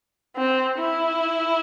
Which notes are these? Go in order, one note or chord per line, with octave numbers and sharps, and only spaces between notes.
C4
E4